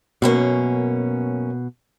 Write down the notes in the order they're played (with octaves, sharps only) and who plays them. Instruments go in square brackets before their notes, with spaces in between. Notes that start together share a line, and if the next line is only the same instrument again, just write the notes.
[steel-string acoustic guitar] F#2 A#3 C#4 [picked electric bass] B2